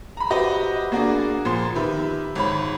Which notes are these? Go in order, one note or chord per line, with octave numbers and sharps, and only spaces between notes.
A#5 B5
F#4 G4 B4 C5 D#5 E5
A#3 D4 F#4 G#4 D5
A#2 F3 C6
D#3 G4 B4 E5
G#1 C#5 B5